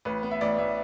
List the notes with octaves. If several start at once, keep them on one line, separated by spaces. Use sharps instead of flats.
A1 B4
B3
E5
A1 D5
A1 E5